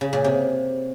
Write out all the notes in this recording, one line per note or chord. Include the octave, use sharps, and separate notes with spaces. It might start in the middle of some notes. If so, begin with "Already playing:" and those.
C#3
A#2
C3